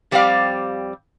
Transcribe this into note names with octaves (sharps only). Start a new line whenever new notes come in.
F2 G3 C4 G4 D5 F5